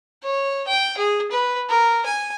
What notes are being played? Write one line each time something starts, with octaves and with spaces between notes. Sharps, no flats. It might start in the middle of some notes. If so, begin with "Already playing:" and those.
C#5
G5
G#4
B4
A#4
G#5